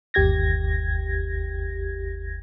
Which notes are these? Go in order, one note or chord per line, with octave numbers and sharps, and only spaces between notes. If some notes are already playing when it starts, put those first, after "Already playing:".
G1 D#2 G4 G#6 A#6